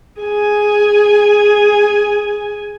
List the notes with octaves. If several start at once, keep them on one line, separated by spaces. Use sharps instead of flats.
G#4 G#5